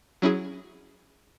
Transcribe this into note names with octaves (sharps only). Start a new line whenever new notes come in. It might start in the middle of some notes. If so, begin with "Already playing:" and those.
F#3 C#4 E4 G#4